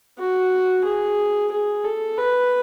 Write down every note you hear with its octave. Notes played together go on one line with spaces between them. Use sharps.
F#4
G#4
G#4
A4
B4